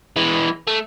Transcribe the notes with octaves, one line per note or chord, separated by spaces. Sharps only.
E3 G#3
A3